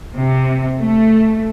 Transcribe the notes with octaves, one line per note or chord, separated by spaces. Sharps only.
C3
A3